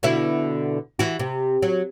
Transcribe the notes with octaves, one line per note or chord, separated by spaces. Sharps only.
B2 D3 E4
E3 F#4
C3
F#3